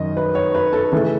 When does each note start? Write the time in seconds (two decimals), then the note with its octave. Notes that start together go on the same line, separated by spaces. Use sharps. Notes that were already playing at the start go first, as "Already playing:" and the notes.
Already playing: F#2 D#3 F#3 D#5
0.17 B4
0.35 C#5
0.55 B4
0.73 A4
0.92 C#3 E3 A3 A4